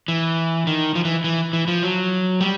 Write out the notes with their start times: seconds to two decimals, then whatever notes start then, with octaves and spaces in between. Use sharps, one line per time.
0.08 E3
0.67 D#3
0.95 F3
1.05 E3
1.24 E3
1.53 E3
1.68 F3
1.83 F#3
2.41 G3